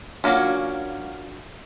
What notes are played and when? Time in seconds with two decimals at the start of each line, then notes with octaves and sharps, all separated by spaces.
0.24 F#3 A#3 C#4 D4 F4 F#4